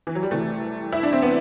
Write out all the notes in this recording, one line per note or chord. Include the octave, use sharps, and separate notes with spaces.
E3
F#3
G3
C2 C3 E3 A3
E4
D4
C4
B3